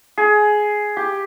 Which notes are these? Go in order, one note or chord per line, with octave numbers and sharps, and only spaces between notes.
G#4
G4